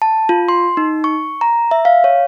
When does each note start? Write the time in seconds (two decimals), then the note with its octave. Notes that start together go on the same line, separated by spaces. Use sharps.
0.02 A5
0.29 F4
0.48 C6
0.77 D#4
1.04 C#6
1.41 A#5
1.71 E5
1.85 F5
2.04 C#5